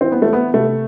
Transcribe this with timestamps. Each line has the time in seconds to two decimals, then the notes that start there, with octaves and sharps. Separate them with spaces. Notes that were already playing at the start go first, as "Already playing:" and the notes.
0.01 E3 C4
0.12 B3
0.22 A3
0.27 E3
0.33 B3
0.54 C3 A3